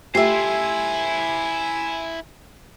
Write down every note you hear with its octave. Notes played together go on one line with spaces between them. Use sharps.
A3 E4 F4 G4 C5 E5 G#5 C6